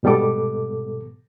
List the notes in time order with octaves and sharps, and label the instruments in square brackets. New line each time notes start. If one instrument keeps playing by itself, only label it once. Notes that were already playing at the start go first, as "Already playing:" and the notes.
[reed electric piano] G#2 B2 G3 B3 A4 D6